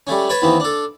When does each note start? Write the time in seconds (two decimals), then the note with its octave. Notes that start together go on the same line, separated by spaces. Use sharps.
0.07 G3 A3 C#4
0.29 B4 C#5 A5 B5
0.42 D#2 E3 B3 C4
0.60 D4 A4